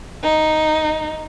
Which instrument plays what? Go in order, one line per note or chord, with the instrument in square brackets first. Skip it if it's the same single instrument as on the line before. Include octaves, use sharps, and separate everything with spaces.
[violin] D#4